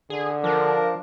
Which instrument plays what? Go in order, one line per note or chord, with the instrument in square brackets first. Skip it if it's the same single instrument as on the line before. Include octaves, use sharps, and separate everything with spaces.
[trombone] D3 [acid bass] G#4
[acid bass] F3 [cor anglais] D4 [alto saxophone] A#4